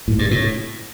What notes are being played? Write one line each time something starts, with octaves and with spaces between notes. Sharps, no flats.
A2
G2
A2